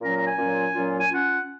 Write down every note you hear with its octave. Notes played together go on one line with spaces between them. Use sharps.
A#2 F#3 C#4 F4 A#5
A#5
G#5
A#2 F#3 C#4 F4
A#2 F#3 C#4 F4
G#5
C#4 F4 F#5